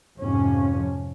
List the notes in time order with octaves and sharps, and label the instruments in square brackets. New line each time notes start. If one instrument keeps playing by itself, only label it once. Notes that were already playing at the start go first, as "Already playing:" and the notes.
[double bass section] F2 G#2 C3 F3 C#4